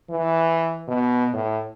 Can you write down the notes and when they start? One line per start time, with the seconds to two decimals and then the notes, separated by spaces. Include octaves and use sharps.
0.10 E3
0.88 B2
1.33 A2